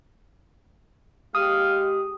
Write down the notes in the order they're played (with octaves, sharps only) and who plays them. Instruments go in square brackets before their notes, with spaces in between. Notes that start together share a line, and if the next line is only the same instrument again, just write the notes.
[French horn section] G#3 G4 [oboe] F5 [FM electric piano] D#6